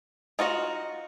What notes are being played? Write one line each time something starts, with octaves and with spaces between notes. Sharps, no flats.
D#4 F4 F#4 D#5